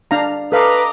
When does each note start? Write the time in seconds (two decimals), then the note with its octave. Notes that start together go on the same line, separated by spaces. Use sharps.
0.11 D4 F5 A#5
0.52 A4 B4 D#5 F5 A#5 D6